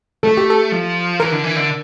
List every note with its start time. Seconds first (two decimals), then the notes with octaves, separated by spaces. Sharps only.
0.23 A3 A4
0.37 G4
0.50 A4
0.72 F3
1.20 E3 A#4
1.32 D3
1.44 E3
1.56 D3